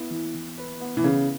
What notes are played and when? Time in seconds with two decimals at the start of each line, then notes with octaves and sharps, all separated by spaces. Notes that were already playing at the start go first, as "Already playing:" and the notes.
Already playing: B3 E4
0.11 E3
0.34 E3
0.58 B4
0.80 B3
0.97 E3
1.04 C#3 E4